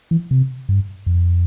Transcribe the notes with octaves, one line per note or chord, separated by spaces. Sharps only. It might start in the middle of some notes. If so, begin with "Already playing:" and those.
E3
C3
G2
F2